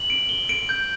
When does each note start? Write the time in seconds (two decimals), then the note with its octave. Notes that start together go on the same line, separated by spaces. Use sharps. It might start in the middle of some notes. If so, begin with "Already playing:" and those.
Already playing: F#7
0.10 D7
0.29 G7
0.49 D7
0.69 G6